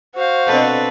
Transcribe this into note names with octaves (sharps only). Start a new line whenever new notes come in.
F#4 C5 F5
B2 C4 D4 A4 B4